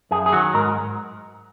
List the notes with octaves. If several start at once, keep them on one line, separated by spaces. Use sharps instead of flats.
F#2 G#4
G#4
D#3 F#3 F#4
G#2 A#4